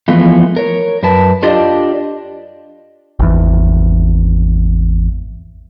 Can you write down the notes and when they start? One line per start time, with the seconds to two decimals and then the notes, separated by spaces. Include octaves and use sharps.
0.08 E3 F3 G#3 A3 B3
0.56 A#4 C#5
1.03 F#2 A#4 B4 A5
1.43 D4 F4 G4 A4 D5 D#5
3.19 G#1 E2